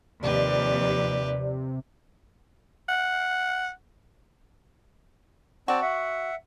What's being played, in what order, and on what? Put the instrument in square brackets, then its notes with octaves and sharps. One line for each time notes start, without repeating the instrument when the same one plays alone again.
[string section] D#2 F3 [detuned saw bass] C3 [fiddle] G4 B4 [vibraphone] D5
[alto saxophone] F#5
[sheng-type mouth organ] C4 D5 A5 [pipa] F#4
[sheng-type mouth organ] E5 F#5